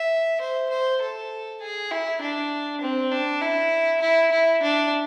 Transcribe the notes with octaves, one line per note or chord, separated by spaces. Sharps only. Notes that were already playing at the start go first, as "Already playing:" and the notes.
Already playing: E5
C5
C5
A4
G#4
E4
D4
C4
D4
E4
E4
E4
D4